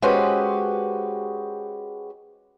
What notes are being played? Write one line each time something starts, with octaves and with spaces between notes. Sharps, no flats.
G#3 C#4 F#4 G4 B4 C5